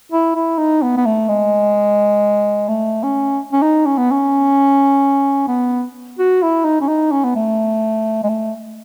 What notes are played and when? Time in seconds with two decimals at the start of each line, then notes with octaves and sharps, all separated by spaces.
0.12 E4
0.35 E4
0.58 D#4
0.82 B3
0.97 B3
1.06 A3
1.29 G#3
2.68 A3
3.03 C#4
3.52 C#4
3.62 D#4
3.86 C#4
3.98 B3
4.11 C#4
5.48 B3
6.19 F#4
6.42 E4
6.65 D#4
6.81 C#4
6.88 D#4
7.12 C#4
7.24 B3
7.35 A3
8.23 G#3
8.29 A3